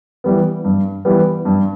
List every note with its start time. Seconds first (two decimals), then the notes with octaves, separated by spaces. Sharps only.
0.24 E3 G3 B3
0.64 G2
1.05 E3 G3 B3
1.45 G2